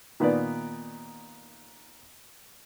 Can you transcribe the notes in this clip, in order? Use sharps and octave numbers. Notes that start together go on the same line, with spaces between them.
A#2 D#3 B3 A#4 B4 D5